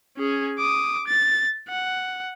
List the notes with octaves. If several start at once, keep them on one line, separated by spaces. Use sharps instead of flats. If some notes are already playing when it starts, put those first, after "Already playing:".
C#4 G#4
D6 D#6
A6
F#5